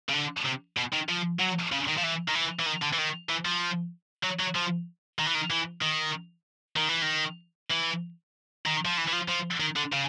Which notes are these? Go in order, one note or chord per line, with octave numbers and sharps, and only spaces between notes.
C#3
D3
C3
B2
D#3
F3
F#3
C#3
D#3
F3
E3
D#3
E3
E3
D#3
D3
E3
D#3
E3
F3
F#3
F#3
F3
D#3
E3
D#3
E3
D#3
D#3
E3
D#3
E3
D#3
F3
E3
E3
F3
F3
D#3
D3
C#3